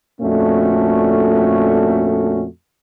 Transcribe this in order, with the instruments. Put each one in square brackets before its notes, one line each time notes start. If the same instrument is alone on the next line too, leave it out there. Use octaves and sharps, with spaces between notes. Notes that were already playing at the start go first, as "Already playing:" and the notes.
[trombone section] F2 A#2 A3 C#4 D4 F#4